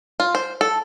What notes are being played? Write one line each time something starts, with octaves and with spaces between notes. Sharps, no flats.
F4
C5
A4